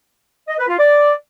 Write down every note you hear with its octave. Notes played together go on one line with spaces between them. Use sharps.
D#5
B4
F4
D5